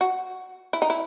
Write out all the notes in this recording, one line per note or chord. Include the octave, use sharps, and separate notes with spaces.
F#4
E4
D#4
E4